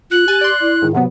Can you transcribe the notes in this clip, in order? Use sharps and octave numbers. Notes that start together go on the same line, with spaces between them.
F4 F#6
G4 G#5 A6
D5 C6
E4
G#2 D#3
C3 F#3 B3 F#5